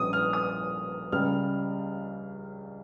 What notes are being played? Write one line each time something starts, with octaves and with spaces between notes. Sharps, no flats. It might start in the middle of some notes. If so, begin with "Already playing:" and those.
Already playing: A#1 A#2 G3 C#4 D#6
F6
D#6
C#2 C#3 G3 F6